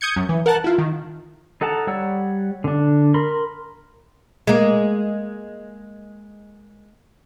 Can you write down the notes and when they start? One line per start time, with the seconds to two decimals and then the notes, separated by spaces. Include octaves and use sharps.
0.01 D#6 G6 G#6 C#7
0.16 F#2
0.29 E3
0.46 A#4 F#5 A5 F#6
0.64 E4 F4
0.78 D#3
1.61 D#4 A4 F#5 A5 A#5
1.87 G3 C#5 D5 F#5 E6
2.64 D3 D4
3.14 A#4 B5 C6
4.47 G#3 A#3